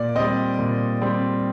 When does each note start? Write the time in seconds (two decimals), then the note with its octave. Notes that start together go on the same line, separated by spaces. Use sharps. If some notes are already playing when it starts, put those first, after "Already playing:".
Already playing: A#2 D5
0.15 G3 C4 D#5
0.59 A#2
1.02 G3 C4